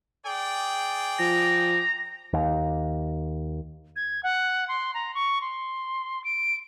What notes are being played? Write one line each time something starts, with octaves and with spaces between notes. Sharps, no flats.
G#4 D5 G5
F3 A#5
D#2
G#6
F#5
C6
A#5
C#6
C6
D7